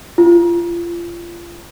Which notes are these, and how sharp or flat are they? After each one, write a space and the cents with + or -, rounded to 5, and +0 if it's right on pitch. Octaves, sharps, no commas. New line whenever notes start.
F4 -30